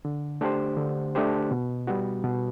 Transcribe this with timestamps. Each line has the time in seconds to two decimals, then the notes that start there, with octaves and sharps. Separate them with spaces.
0.05 D3
0.41 A3 D4 G4 C5
0.77 D3
1.15 A3 D4 G4 C5
1.51 B2
1.87 G3 B3 F#4
2.24 B2